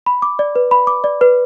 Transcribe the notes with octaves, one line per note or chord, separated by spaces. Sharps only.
B5
D6
D5
B4
B5
D6
D5
B4